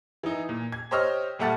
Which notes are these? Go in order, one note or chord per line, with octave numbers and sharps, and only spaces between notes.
E3 D#4
A#2
G#6
G4 C5 C#5 D#5 E6 F6
A#2 G3 A3 F#5 A5 A6